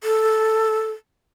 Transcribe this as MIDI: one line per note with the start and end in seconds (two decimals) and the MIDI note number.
0.04 0.90 69